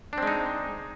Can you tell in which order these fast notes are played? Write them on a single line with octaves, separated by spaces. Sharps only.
D4 C4 G#3 D#4